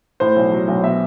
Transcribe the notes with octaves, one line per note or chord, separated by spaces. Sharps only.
A2 C5
B1
F#3
B1
B2 E5